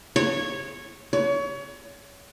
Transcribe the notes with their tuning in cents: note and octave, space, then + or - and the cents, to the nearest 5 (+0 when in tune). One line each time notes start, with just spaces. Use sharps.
C#5 -10
C#5 +30